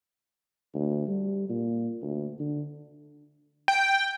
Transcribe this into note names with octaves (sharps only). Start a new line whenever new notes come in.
D2
G3
A#2
D2
D3
G5